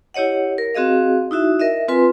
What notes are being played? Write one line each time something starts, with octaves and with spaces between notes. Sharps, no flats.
E4 G4 C#5 D#5 F#5
A#4
C4 F#4 G#4 D#5 F5
D#4 E4 F#4 E5
A#4 D#5 E5
C4 F4 B4 G#5 C6